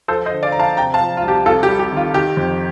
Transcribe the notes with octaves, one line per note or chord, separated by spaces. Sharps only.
F3 A4 C5
C5 D#5
D3
D5 F5
F3 A#5
F5 A5
C3 G5 A#5
F5 A5
F3
F4
C2
G4
C2 F4 A4
G4
G3
G4
D#3
F4
D#3 G4
F2